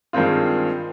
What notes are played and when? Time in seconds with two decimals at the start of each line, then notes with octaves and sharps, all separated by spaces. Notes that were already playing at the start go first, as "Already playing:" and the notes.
0.13 G2 D#3 G#3 C4 F4